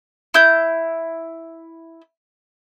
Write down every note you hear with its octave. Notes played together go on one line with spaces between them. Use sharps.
E4 G6